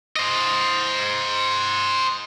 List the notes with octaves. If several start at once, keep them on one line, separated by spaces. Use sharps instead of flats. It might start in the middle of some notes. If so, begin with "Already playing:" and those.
C5 D#5